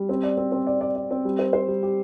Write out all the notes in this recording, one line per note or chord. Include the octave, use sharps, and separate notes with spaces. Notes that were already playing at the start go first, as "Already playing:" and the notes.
Already playing: G3
C4
D5
C4
C4
D5
D5
D5
C4
G3
C5
C5
G3
G4